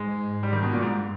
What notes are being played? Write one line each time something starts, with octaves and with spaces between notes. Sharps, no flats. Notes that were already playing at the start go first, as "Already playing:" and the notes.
Already playing: G#2 G#3
G3
D#3
B2
G2 A#2
G#2